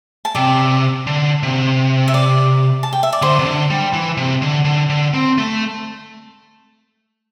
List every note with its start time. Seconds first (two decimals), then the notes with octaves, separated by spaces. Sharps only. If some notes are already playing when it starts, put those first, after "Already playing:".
0.25 A5
0.35 C3 D5 G5
1.07 D3
1.43 C3
2.08 E5
2.14 D5
2.83 A5
2.93 G5
3.03 E5
3.13 D5
3.22 D3 C5
3.39 C3
3.45 D3
3.70 G3
3.93 E3
4.17 C3
4.42 D3
4.65 D3
4.90 D3
5.14 C4
5.38 A3